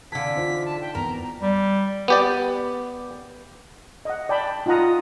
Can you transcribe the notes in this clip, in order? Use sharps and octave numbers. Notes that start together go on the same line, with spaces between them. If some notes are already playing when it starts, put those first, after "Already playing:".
D3 E3 F5 F#5 A5 B6
D#4 F4 C5
A5
G5
E2 A#4 A#5
G3
B3 G4 D5
D#5 F#5
D5 G5 A5 B5
D#4 F4 D#5 F#5 A#5 D#6
D#6